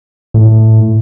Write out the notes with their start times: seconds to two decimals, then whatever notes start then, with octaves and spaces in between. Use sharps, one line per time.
0.34 A2